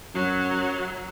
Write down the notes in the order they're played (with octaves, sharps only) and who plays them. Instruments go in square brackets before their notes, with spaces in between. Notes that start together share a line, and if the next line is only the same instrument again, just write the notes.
[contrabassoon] F#2 [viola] F#3